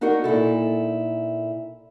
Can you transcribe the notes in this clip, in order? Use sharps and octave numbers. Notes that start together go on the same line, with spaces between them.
D4 D#4 F#4 A#4 F#5
A#2 D#4 E4 A4